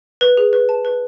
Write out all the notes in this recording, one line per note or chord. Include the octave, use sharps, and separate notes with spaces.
B4
G#4
B4
A5
B4